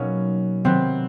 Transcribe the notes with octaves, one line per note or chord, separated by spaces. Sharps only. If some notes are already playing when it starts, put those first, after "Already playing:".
Already playing: B2 F#3 A#3 C#4 D#4
C3 D#3 F#3 B3 C4